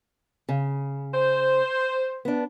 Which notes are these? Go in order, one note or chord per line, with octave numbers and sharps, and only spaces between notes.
C#3
C5
B3 D4